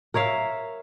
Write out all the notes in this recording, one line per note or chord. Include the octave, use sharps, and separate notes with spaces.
A#4 C#5 E5 F5